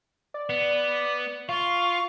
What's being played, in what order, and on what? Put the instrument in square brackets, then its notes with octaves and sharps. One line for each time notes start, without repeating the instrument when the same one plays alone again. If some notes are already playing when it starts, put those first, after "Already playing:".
[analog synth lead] D5
[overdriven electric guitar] B3
[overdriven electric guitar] F4 [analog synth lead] F5 [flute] C#6